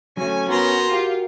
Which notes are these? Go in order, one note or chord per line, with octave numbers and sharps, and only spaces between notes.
F#3 A3 C#4 G#5
B3 F#4 A#4 C5 A#5
F4 G4